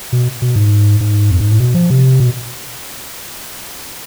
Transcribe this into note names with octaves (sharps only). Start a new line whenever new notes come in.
B2
B2
G#2
G#2
F2
G#2
A2
B2
F3
C3
B2